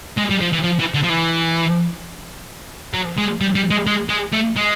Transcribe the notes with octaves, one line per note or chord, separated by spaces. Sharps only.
G#3
G3
F3
E3
F3
E3
D3
F3
E3
F#3
G#3
G3
G3
G#3
G#3
G#3
A3
G#3